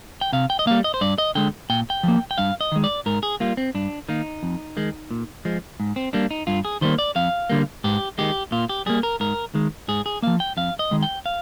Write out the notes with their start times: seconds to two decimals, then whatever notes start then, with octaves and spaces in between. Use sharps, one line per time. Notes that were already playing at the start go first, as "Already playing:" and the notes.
0.21 G5
0.33 C3 F5
0.50 G5
0.59 D#5
0.67 G3 A#3 F5
0.84 D#5
0.94 C5
1.01 G2 D5
1.18 D#5
1.35 D3 G#3 G5
1.70 A#2 G5
1.90 G5
2.03 F3 A#3
2.31 G5
2.38 G2 F5
2.61 D#5
2.72 D#3 G#3
2.84 D5
3.06 G#2 A#4
3.23 G#4
3.40 G3 A#3 F4
3.57 C4
3.75 G2 D4
4.09 D#3 A#3 D#4
4.43 F2
4.77 D#3 G#3
5.11 A#2
5.45 F3 G#3
5.80 G#2
5.96 C4
6.13 G3 A#3 D4
6.31 D#4
6.47 G2 F4
6.65 G#4
6.81 D#3 G3 A#3 C5
6.99 D5
7.16 F2 F5
7.50 D3 G3 A#3
7.84 G#2 G4
8.18 D#3 G#3 G4
8.52 A#2 F4
8.69 G4
8.86 G3 A#3 G#4
9.03 A#4
9.20 G#2 A#4
9.54 D#3 G#3
9.88 G#2 G#4
10.06 G#4
10.22 F3 A#3 F5
10.40 G5
10.57 F2 F5
10.79 D#5
10.91 D#3 G#3
11.03 G5
11.26 F5